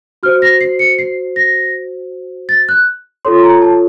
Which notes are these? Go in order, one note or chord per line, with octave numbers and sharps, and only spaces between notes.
F#4 C5 F6
A#6
C7
C#7
C7
A#6
A6
F#6
F4 A4 C#5 C6
A#5
A5